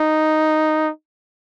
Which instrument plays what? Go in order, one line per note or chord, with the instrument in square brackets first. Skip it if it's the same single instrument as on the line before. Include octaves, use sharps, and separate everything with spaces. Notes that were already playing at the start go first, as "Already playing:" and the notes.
Already playing: [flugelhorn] D#4